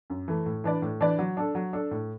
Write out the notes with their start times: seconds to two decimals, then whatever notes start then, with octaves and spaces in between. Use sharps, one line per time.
0.10 F#2
0.28 E3 A3
0.46 A2
0.64 E3 D4 B4 D5
0.82 A2
1.01 E3 D4 B4 D5
1.19 F#3
1.37 D4 A4
1.55 F#3
1.73 D4 A4
1.91 A2